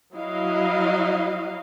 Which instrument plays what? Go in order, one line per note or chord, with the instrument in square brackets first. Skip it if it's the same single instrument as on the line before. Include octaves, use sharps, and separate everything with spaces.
[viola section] F#3 E4 D#5 F5